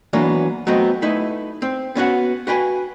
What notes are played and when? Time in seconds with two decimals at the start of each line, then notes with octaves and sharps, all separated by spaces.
0.13 E3 F#3 A#3 B3 D4
0.67 F#3 A3 B3 C4 D#5
1.02 A3 D#4 E4 B4
1.62 C4
1.95 B3 C#4 F#4 F#5
2.47 F#4 B4 G5 G#5